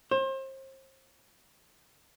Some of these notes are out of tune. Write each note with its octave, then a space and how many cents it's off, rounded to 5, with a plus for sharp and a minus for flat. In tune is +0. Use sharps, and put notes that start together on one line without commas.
C5 +35